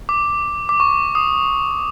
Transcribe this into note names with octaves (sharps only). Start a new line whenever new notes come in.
D6
D6
C#6
D#6